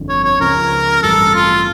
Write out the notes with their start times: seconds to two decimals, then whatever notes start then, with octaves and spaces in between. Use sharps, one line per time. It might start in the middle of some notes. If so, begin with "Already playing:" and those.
Already playing: G1 F2 D3
0.09 C#5
0.24 C#5
0.40 C#2 C#3 F3 C#4 A#4
1.03 A1 G2 E3 G3 A4
1.35 F4